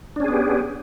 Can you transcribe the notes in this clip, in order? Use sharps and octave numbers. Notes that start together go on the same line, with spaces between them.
B3 C#4 D4 G4 G#4